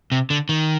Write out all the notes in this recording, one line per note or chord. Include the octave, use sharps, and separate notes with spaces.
C3
D3
D#3